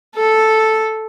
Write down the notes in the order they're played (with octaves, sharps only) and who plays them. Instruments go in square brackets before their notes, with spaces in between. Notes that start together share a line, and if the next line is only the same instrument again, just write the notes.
[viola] A4